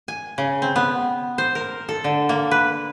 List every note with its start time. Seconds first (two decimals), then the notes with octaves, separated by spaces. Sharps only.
0.08 G#5
0.38 C#3
0.62 C4
0.76 B3
1.38 C5
1.55 A#4
1.89 A4
2.04 D3
2.29 A#3
2.51 B4